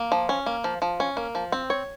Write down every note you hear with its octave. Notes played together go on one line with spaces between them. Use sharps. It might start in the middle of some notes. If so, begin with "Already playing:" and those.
Already playing: A#3
F3
C#4
A#3
F3
F3
C#4
A#3
F3
C4
C#5